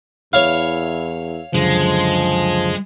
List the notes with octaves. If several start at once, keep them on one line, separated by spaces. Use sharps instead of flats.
E2 E4 C#5 F5
C#2 F#2 D3 F3 G#3